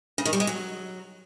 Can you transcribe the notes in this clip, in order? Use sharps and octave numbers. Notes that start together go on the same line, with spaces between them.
C#3
D#3
G3
G#3
F#3